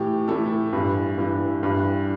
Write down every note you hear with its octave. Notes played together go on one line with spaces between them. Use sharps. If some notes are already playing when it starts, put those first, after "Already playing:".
Already playing: A2 E3 G4
A2 E3 E4 A4
G2 E3
G2 E3
G2 E3